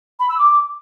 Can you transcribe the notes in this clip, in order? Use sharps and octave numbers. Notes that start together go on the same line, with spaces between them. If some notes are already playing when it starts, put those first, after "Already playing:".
B5
E6
D6